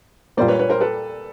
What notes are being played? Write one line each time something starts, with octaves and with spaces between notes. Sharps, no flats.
A#2 G3 A#3 C5 D5
B4 C#5
B4 C#5
A#4 C5
A4 B4